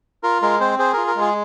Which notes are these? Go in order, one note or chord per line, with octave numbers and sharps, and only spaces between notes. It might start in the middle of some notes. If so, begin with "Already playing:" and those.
F4 A#4
G#3 A#4
C4 C5
G#4 C5
F4 A#4
A#4
G#3
G#4